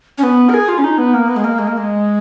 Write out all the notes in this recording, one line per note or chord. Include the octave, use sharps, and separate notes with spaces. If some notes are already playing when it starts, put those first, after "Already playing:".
C#4
B3
A#4
G#4
F4
C#4
D#4
B3
A#3
B3
G#3
A#3
G#3
A#3
G#3